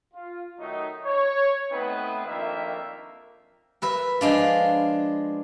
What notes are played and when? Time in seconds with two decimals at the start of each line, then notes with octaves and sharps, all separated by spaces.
0.14 F4
0.60 D#3 F#3 A3 D#4
1.05 C#5
1.72 A3 B3 C4 D#4 B4
2.25 F2 D#3 A#3 D4 E5
3.82 A#4 B4 E5
4.21 F3 G#3 D4 F4